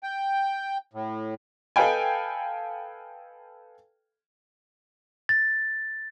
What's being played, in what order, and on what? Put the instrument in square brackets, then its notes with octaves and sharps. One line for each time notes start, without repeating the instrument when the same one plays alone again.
[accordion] G5
A2
[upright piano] A4 B4 D#5 F5 G5 G#5
[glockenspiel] A6